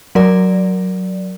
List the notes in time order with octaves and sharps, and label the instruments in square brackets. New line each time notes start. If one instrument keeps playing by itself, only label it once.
[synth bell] F#3 A#4 D5